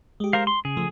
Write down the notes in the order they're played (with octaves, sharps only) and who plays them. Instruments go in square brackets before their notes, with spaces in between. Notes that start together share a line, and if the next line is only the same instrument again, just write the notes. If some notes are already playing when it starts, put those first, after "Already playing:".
[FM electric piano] G#3 G4
[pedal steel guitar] A#4 C5 F5
C6
[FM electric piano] C#3 [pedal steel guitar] G#4
[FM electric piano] C#3 F3 A3